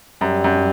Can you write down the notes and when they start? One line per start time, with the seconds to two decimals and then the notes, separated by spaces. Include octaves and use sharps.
0.21 F#2 G3
0.44 F#2